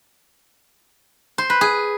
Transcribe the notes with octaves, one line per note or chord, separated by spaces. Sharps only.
C5
B4
G#4